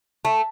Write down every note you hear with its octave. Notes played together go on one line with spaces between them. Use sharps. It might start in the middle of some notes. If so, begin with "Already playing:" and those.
A3